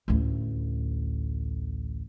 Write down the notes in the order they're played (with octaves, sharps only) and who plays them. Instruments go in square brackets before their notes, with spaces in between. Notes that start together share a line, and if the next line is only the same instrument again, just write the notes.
[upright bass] A1 D2